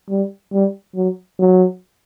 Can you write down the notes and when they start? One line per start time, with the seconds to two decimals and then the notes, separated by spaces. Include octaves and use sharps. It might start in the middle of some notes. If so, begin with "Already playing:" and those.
0.10 G3
0.53 G3
0.95 F#3
1.39 F#3